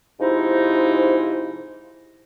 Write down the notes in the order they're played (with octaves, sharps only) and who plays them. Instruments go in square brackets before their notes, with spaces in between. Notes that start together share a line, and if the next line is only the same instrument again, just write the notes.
[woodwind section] G#2 C3 F3 D#4 E4